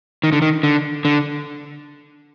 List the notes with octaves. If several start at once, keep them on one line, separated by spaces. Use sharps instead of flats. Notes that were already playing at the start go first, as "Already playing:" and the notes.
D#3
D3
D#3
D3
D3